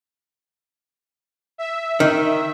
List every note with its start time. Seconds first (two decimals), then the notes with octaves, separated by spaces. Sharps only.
1.58 E5
2.00 D#3